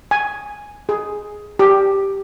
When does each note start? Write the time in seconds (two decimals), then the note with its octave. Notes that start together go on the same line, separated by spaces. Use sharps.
0.11 G#5
0.89 G#4
1.59 G4